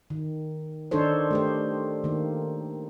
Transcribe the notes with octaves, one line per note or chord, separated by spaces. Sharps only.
D#3
D#3 D4 D#4 A4 C5 C#5
A3 G4 C5
D#3 A#3